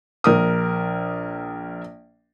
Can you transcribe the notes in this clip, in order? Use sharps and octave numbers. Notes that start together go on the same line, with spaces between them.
A#1 A#4 D#6